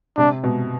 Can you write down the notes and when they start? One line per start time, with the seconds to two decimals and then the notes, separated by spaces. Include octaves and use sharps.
0.17 C3 D4
0.44 B2